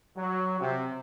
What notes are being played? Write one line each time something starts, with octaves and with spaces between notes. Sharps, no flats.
F#3
C3